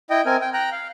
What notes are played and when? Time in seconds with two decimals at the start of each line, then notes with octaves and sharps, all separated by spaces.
0.10 E4 D#5 G5
0.26 C4 A#4 G#5
0.41 G5
0.54 G5 A#5 F#6
0.72 F5